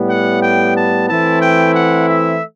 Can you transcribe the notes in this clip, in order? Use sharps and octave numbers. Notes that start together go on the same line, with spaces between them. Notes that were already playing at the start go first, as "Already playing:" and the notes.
Already playing: A2 G3 B3
F#5
G5
A5
E3 A3 C4 E4 A5
G5
F#5
E5